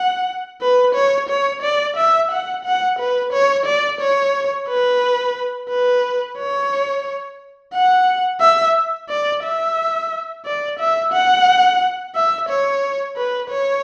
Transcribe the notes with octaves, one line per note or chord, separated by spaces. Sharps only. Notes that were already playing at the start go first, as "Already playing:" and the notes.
Already playing: F#5
B4
C#5
C#5
D5
E5
F#5
F#5
B4
C#5
D5
C#5
B4
B4
C#5
F#5
E5
D5
E5
D5
E5
F#5
E5
C#5
B4
C#5